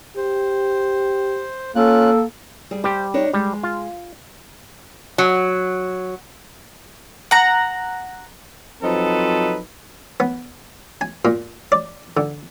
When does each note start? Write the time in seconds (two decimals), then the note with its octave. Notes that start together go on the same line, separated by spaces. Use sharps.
0.17 G4 C5
1.75 A#3 C#4 F4 A4 F#6
2.71 G3 G#4
2.84 G3 G4 C5
3.14 D4 D#4 C#5
3.34 G3 G#3
3.63 F4
5.18 F#3
7.31 F#5 A#5
8.83 F3 F#3 C4 D#4 A4 B4
10.20 B3
11.01 G#5
11.25 A#2
11.72 D5
12.17 D3